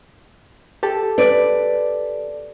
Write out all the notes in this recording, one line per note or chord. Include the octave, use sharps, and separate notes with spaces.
G4 A4 A5
B4 D5